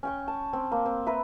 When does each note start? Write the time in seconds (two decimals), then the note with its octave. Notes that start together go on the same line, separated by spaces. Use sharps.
0.03 C#4 G5 C#6
0.28 A5
0.53 C4
0.72 A#3
0.86 C4
1.06 A#4 B4 E5